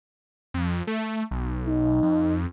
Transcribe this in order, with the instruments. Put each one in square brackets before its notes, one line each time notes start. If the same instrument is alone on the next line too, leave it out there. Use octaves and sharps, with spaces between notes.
[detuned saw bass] F2
A3
B1
[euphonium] D#4
[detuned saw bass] F2